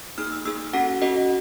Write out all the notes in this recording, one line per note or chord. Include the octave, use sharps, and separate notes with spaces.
A#3 D#4 G#4 F6
E6
A#3 D#4 G#4 E6
C#4 F#4 A4 F#5
C#4 F#4 A4 D#5